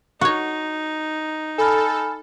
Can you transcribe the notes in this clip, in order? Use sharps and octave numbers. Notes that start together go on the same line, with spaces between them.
D#4 F#4 C#5
A4 G#5 B5 F6